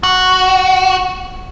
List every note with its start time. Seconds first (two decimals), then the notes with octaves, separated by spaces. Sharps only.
0.03 F#4